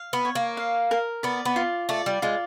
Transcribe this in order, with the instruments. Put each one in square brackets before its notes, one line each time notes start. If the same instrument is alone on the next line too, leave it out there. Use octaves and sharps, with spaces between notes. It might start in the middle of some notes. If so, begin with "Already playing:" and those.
Already playing: [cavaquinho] F5
[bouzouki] B3
[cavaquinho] C#5
[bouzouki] A#3
[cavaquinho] F5
A#4
[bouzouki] B3 [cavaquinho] D5
[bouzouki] B3
[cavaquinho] F4
[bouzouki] A3 [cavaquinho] D5
[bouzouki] G3
[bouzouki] G#3 [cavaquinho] F4